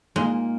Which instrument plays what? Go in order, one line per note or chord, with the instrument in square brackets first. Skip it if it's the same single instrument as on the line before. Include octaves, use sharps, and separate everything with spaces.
[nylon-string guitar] A#2 A#3 D#4 A#4 D#5 [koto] G#3